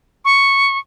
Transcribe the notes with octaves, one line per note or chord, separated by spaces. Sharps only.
C#6